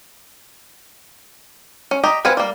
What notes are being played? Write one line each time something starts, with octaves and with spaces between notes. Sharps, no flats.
C#4
G4 D#5 A#5
C4 B4 F5 F#5 G#5
G3 A#3